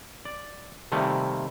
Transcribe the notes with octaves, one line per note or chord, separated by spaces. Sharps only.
D5
C3 D#3 G3 A3 A#3